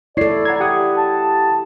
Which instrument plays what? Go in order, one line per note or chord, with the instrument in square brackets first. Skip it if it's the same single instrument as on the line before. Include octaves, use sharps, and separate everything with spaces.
[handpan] E4 A4 [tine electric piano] C#5 C7 [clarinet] D5
[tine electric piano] F#5 A#5 G#6
G4 F#5 D#6
[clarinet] A5